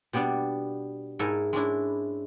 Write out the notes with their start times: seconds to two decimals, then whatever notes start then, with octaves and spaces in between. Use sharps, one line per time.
0.13 B2 G3 B3 D4 D5
1.19 G#2 E4 A4 A#4 G#5
1.53 G#3 C#4 D4 E4